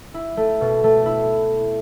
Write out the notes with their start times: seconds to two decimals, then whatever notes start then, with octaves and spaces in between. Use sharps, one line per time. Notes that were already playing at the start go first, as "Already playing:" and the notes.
0.14 E4
0.37 A3
0.61 B2
0.84 A3
1.06 E4